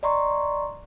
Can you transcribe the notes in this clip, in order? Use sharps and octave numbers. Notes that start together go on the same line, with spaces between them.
D5 D#5 A#5 C6 C#6